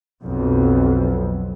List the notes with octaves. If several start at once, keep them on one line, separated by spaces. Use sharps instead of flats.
B1 F2